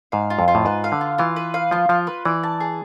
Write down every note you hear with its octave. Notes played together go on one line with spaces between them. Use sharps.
G#2 F5
F4
F2
F4
A2
G#2 B4
F5
D3
F4
E3 F4
B4
F5
F3 F4
F3 F4
B4
E3 D5
A5
G#4